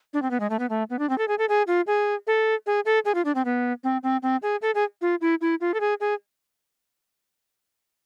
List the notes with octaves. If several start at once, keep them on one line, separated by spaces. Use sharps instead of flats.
D4
C4
B3
G#3
A3
B3
A3
B3
D4
C4
A4
G#4
A4
G#4
F4
G#4
A4
G#4
A4
G#4
F4
D4
C4
B3
C4
C4
C4
G#4
A4
G#4
F4
E4
E4
F4
A4
G#4
G#4